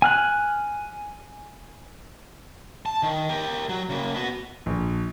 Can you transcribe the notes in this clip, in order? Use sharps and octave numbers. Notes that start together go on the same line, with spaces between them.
G#5 F6 F#6
A5
D#3
G4 A#4
F#3
C#3 A#3
B3 F#4
A#1